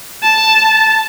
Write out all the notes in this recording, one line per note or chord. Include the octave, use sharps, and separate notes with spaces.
A5